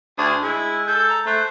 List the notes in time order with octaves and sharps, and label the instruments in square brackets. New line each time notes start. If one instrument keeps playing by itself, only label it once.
[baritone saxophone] D2 [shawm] G#4
[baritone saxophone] G#3 [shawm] E4
[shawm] A4 [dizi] G6
[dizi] A#5
[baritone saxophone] A3 [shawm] C5 [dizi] F#6